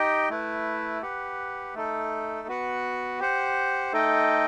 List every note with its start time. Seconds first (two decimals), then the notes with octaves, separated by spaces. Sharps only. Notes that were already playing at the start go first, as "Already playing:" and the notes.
Already playing: D#4 G4 D#5 G5
0.30 A3 E4 B4
1.02 G4 B4 F#5
1.75 A3 D#4 A4
2.48 B3 F#4 B4 F#5
3.20 G4 C5 F#5
3.93 A3 D#4 A4 D#5 G5